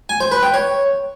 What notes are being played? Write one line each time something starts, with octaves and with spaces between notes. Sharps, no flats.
G#5
C5
B4
G5
C#5